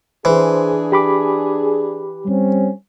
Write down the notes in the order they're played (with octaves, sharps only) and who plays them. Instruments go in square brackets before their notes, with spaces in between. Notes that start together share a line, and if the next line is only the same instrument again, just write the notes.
[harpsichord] E3 [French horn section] D4 G#4 [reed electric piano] C5 C6
[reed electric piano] G4 B5 D6
[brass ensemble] G3 C4 C#4